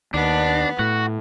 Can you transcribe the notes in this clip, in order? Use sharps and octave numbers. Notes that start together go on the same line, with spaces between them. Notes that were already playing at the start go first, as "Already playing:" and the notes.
D#2 B3 D4
A2 F#4